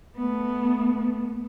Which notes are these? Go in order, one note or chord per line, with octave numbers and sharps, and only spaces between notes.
A3 B3